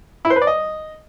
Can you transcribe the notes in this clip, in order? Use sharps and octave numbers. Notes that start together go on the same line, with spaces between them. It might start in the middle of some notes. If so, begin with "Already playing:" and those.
E4
C5
B4
D5
D#5